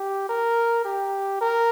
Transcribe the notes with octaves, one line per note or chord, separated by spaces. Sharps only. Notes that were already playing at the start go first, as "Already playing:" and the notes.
Already playing: G4
A#4
G4
A#4